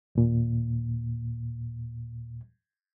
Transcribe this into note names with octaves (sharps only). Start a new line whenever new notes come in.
D#2 A#2